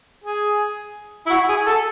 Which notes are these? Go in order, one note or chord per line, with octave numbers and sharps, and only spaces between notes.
G#4
E4
F#4
G#4
A4